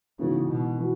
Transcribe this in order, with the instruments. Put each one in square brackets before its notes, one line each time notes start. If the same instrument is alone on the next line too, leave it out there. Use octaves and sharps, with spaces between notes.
[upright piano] G#2 E3 B3 F#4 [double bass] C#3
[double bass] B2
[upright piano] E3 B3 F#4